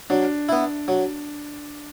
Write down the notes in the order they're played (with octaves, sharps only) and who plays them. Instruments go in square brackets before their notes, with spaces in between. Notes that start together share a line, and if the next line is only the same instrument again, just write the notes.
[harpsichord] F#3 [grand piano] D4
[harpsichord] B3 E4
F#3